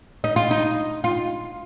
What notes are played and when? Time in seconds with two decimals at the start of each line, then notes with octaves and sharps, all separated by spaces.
0.24 D#4
0.36 F4
0.51 D#4
1.04 F4